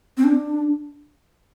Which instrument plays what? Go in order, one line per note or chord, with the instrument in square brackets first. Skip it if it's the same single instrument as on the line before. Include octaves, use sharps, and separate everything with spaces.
[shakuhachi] C4
D4